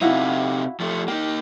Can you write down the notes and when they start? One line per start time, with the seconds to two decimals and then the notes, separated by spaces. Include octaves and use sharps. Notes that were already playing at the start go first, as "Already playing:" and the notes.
0.01 C3 D#4 E4 F#4 F5
0.80 F3 A3
1.08 A#3 D#4 G4